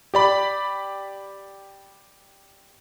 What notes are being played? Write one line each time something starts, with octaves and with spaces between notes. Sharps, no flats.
G4 D5 B5